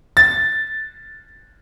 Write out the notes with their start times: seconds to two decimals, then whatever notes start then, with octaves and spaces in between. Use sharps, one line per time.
0.17 A6